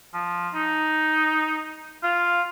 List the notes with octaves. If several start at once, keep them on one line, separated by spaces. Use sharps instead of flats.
F3
D#4
F4